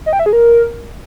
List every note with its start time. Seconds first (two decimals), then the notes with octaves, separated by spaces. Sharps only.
0.06 D#5
0.13 G5
0.19 E5
0.26 G#4
0.33 A#4